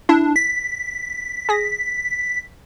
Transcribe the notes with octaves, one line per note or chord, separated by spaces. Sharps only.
D4 E4
B6
G#4 A#6